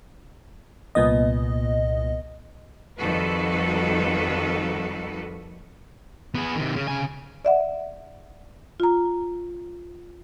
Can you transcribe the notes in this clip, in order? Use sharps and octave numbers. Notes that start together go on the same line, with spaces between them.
C2 A#2 B3 D#5
F2 D#3 G3 F#4 A4 B4
B3 G#4
C3 D#3
C#3
C#3 G#5
D5 E5 F#5
F4 A#5